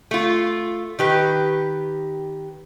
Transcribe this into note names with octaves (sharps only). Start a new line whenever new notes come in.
A3 F4
D#3 G4 B4